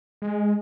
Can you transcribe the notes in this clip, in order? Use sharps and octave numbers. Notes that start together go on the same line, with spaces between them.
G#3